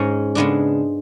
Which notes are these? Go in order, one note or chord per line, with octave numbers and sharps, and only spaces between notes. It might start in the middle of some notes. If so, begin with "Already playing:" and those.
Already playing: G#2 G#3 C#4
C#3 G#3 B3 D4